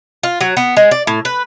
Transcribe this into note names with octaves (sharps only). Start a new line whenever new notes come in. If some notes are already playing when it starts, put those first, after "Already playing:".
F4
F#3
B3
G#3
D5
A2
B4